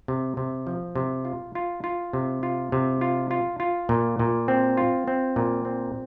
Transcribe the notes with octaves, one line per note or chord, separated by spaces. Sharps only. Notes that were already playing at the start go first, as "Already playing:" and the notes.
C3
C3
F3
C3
F4
F4
F4
C3
F4
C3
F4
F4
F4
A#2
A#2
C4
F4
C4
A#2
C4